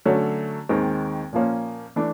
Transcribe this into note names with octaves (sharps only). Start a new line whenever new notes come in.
D3 F#3 A3 C#4
D#2 D#3 G#3 C4
A#2 F3 A#3 C#4
E3 A3 D4